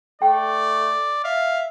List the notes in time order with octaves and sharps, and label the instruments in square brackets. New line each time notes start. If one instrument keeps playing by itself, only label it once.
[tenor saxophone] A3 [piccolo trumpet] D5 [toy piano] G5
[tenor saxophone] E5 [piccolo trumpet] F5